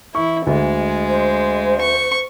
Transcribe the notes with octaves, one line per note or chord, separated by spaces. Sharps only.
E3 E4 C#6
D2 G#3
C5
C#6